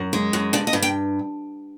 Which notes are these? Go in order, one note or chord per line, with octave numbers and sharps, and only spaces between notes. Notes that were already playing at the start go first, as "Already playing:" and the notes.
Already playing: F#2
G#3
F#2
G2 D5
D#5
G2
G5